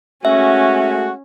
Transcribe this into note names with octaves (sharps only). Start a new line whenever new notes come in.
G#3 A3 C#4 F#4 E5